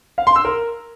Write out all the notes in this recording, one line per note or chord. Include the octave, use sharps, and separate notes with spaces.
F5
C6
E6
A#4